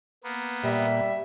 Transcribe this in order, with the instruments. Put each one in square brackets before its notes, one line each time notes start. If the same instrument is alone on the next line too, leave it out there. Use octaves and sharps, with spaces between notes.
[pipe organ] A#3 B3
[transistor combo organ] A#2 [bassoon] G3 [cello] E5